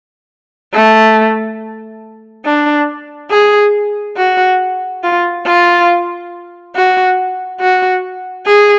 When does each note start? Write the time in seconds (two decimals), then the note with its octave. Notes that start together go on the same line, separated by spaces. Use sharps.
0.73 A3
2.45 D4
3.31 G#4
4.17 F#4
5.03 F4
5.46 F4
6.75 F#4
7.60 F#4
8.46 G#4